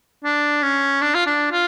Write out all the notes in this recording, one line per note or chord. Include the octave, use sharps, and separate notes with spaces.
D4
C#4
D4
F4
D4
F4